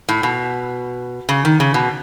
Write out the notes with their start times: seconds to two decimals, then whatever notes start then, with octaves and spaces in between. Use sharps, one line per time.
0.09 A2
0.23 B2
1.29 C#3
1.45 D#3
1.60 C#3
1.74 B2